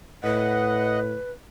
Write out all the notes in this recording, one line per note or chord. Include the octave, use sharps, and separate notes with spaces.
A2 B4 D#5 F#5